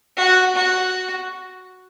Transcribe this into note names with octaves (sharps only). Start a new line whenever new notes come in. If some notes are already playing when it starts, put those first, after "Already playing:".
F#4
F#4